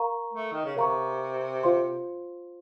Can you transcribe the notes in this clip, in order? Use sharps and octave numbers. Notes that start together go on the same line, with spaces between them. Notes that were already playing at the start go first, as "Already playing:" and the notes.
Already playing: A#4 F5 A#5 C#6
A3
D#3
C#3
C3 A#4 F5 A#5 C#6
F4 C5 F5 C6